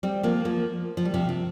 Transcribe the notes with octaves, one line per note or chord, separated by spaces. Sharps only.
G3 C4
F3 A#3
F3 A#3
F3
G3
C3 F3
C3